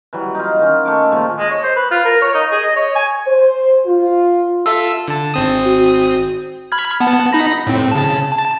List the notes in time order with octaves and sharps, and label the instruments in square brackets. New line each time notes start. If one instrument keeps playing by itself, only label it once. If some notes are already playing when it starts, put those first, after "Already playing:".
[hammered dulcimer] E3 F#3 G3
D#4 F4
D#3 C#4
A3 C#6 D6
A#2 D#3 F3 G#3
[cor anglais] G#3
C#5
C5
B4
F4
A#4
C#5
D#4
G#4
D#5
C#5
G#5
[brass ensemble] C5
F4
[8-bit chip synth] F4 A4 E5 [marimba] E6
[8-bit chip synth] D3 A5
G#1 C4 D#6
[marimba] F#4
[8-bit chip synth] B5 F6 G#6
B3 F#5 A5
D#4 B5 A#6
A2 C4
C#3 A5
A5